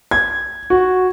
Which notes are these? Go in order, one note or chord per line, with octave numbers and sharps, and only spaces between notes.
G#6
F#4